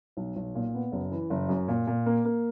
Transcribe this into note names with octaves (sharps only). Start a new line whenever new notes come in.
B1
B1
A#2
B3
F#1
E3
F#1
F#2
A#2
A#2
A#3
A#3